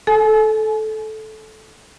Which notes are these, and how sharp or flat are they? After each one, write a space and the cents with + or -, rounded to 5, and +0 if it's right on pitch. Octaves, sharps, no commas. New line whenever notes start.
A4 -15 G#5 +45